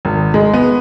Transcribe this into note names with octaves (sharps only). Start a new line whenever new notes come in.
G#1
G#3
B3